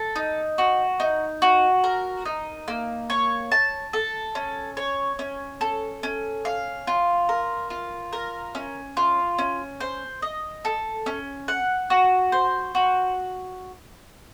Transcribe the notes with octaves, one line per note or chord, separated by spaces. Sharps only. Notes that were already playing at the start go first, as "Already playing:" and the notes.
Already playing: A4
D#4
F#4
D#4
F#4
A#4
D#4
A#3
C#5
A5
A4
C#4
C#5
C#4
A4
C#4
F5
F4
A#4
F4
A#4
C#4
F4
C#4
C5
D#5
A4
C#4
F#5
F#4
C5
F#4